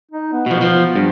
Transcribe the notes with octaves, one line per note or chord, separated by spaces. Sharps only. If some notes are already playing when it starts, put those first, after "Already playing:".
D#4
B3
B2 F3
F3
G2